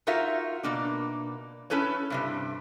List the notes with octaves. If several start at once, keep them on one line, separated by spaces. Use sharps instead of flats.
D#4 F4 F#4 A#4 E5 F5
B2 A#3 D4
C#4 E4 A4 B4 C#5
G2 C3 G3